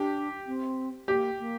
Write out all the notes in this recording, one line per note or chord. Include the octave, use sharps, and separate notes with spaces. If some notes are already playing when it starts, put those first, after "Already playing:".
Already playing: D4 G4
C4
A#3 G4
A#3